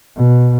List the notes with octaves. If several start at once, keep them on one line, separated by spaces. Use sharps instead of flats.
B2